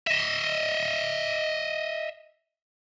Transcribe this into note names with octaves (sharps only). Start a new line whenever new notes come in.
D#5 E5